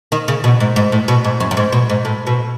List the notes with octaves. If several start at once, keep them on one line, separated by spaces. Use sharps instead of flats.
D#3
C#3
B2
G#2
G#2
A2
B2
G#2
F#2
F#2
G#2
B2
G#2
A2
B2